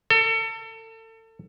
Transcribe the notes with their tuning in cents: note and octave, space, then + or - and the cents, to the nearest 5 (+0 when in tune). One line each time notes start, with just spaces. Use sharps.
A4 +30